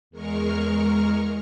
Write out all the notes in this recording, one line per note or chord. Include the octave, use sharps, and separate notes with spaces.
E2 G#3 A#4 C#6 F6